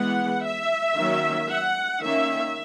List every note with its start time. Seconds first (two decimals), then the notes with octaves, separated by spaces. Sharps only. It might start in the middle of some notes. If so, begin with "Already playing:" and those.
Already playing: E3 G#3 B3 F#5
0.44 E5
0.96 D#3 F#3 A#3 C#4
1.50 F#5
2.03 D#3 A#3 C#4 E5